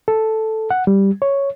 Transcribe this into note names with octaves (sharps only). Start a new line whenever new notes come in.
A4
F#5
G3
C#5